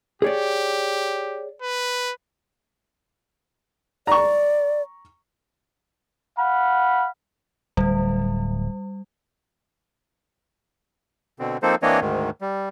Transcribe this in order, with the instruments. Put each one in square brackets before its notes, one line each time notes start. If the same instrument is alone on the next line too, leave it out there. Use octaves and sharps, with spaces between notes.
[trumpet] G4 [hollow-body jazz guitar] G#4 C#5 D5
[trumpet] B4
[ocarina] D5 [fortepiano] A#5 C#6
[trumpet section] F5 F#5 B5
[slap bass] D1 [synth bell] G3
[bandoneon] B2 D3 C4
F3 A#3 C4 D#4 A4 C5
E3 A#3 C4 D4 C#5 D#5
D2 G#2 D#3
G3